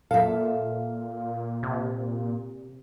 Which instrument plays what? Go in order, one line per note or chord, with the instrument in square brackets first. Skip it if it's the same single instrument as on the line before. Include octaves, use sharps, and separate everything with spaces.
[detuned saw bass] A#2 [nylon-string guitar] A4 E5 [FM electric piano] F5
[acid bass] C3